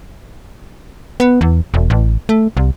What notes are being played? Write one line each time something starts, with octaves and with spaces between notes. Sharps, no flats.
B3
E2
E1
A1
A3
C2